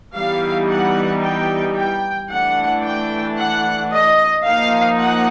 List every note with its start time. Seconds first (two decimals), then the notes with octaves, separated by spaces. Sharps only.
0.15 E3 G3 B3 D#4 F5
0.70 F#5
1.23 G5
1.77 G5
2.30 E3 A3 D4 F#5
2.84 G5
3.38 F#5
3.92 D#5
4.45 F3 A#3 D#4 F5
4.99 F#5